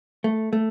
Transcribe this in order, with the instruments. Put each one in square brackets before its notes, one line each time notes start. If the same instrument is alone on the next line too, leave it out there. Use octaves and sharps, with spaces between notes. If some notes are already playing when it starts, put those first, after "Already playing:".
[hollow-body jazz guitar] A3
A3